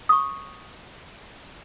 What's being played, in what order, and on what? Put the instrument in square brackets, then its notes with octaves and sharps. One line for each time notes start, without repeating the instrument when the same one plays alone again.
[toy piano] C#6 D#6